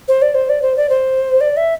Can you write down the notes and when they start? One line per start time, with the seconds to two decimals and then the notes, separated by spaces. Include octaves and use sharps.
0.08 C5
0.22 D5
0.34 C5
0.49 D5
0.62 C5
0.77 D5
0.89 C5
1.41 D5
1.57 E5